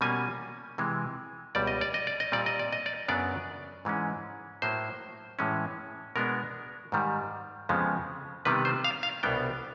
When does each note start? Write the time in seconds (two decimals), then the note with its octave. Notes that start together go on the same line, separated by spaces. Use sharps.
0.01 B2 G3 A#3 C#4 G#5
0.78 C3 E3 G#3
1.55 C#2 B2 G3 D5
1.67 D#5
1.81 D5
1.94 D#5
2.07 D5
2.20 D#5
2.32 A#2 G3 C4 D5
2.46 D#5
2.59 D5
2.72 D#5
2.86 D5
3.08 F#2 C#3 F#3 B3 D4 D5
3.85 G#2 E3 G#3 C#4
4.62 A2 F#3 A#3 C5
5.39 A2 E3 G#3 C#4
6.16 B2 G#3 B3 D4 A#4
6.92 G#2 D#3 G3
7.69 F2 C#3 F3 G#3 B3
8.45 C3 D#3 G3 B3 D4 B4
8.65 C5
8.84 F5
9.03 F5
9.23 C2 B2 G3 B3 D4 G5